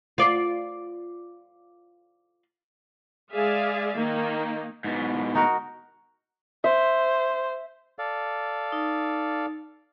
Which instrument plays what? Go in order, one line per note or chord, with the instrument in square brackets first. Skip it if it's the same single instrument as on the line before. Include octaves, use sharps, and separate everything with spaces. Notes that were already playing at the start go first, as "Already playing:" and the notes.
[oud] F4 D5
[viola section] G#3 G#4 D5 E5 F5
D#3 A#3 D#4
[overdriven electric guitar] G#2 B2
[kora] D#4 F#4 A#4
[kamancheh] C5 [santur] E5
[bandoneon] A4 D5 F5
[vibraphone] D#4